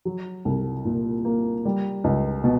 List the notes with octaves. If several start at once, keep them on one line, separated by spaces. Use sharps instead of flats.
F#3
C2
A#2
A#3
G3
C#2
B2